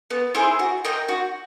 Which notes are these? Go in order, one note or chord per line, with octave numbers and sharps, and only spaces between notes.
B3
E4 G#4 C5
F#4
A#4 D#5 G5
F#4